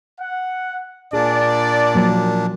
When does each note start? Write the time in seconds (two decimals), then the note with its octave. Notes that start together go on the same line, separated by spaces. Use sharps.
0.20 F#5
1.13 A#2 D4 G#4 D5
1.95 F3 F#3 A#3